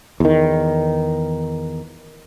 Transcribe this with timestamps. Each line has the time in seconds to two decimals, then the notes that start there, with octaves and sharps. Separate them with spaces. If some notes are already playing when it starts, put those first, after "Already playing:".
0.20 E2 D#3